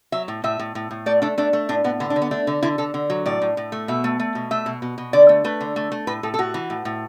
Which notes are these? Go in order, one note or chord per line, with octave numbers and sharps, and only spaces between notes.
F#3 E5
A2
A2 E5
A2
A2
A2
A3 D5
A3 D4
A3 D4
A3
A2 D4
A2 B3
D3 B3
D4
D3
B3
A3 D4
D3
D3 E4
D3 A4
D3
F#3
A2 D5
A2
A2
A3
B2 E5
A3
A3
B2
A3 E5
B2
B2
B2
D3 D5
A3
A3 B4
D3
A3
A3
A2 B4
A2 A4
A4
A2 F#4
E3
A2
A2